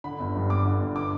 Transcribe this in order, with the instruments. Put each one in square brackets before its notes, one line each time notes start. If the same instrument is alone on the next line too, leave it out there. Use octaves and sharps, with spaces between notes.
[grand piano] D3 B5
G1
G2
G1 D6
D3
G1
D6